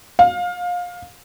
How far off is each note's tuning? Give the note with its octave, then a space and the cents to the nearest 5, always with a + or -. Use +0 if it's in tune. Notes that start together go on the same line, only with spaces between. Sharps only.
F5 +25